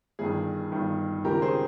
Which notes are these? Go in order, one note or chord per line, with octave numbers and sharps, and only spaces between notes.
G1 G2 D#3 G#4
G1 G2 D#3
C#2 C3 D#3 G4 A#4
G#4 C5